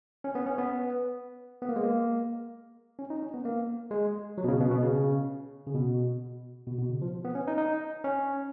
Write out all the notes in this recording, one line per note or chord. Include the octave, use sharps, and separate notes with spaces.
C#4
B3
C#4
B3
B3
A#3
G#3
A#3
C#4
D#4
C#4
B3
A#3
G#3
F#3
B2
C#3
B2
B2
C#3
C#3
B2
B2
B2
C#3
F3
B3
C#4
D#4
D#4
C#4